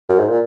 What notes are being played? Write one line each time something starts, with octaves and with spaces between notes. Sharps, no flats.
F#2
G#2
A#2